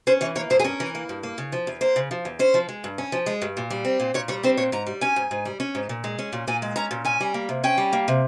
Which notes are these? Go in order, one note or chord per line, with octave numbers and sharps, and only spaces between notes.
C#4 C5
E3 C#5
A#3 C#5
G2 C5
G#4
C#4 A#4
E3
A#3
G2
A#3
C#3
F3
E2
A#3 C5
C#3
F3
E2
C#4 C5
F3
G#3
G2
C#4
F3
G#3
G2
A#2
G3
C4
A#2
A#2 C#5
G3 C#5
C4 C5
A#2 C#5
G#2 A#5
G3
C#4 G#5
G#2
G#2
G3
C#4
G#2
A#2
G#3
C#4
A#2
A#2 G#5
G#3
C#4 A#5
A#2
C#4 G#5
G3
A#3
C3
C#4 G5
G3
A#3
C3